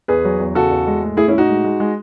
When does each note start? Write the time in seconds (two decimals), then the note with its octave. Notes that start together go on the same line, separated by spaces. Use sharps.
0.08 E2 G#4 B4
0.25 F#3
0.39 E2
0.55 C#3 F#4 A4
0.71 E2
0.87 G#3
1.02 A2
1.17 A2 E4 G#4
1.28 C#4 E4
1.33 A2 D#4 F#4
1.49 G#3
1.64 G#3
1.80 G#3